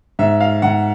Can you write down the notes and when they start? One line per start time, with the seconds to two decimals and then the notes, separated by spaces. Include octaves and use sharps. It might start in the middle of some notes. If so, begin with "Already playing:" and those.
0.19 G#2 E5
0.40 F5
0.62 G#2 F#5